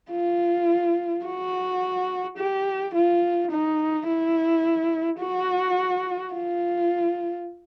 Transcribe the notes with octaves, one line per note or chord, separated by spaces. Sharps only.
F4
F#4
G4
F4
D#4
E4
F#4
F4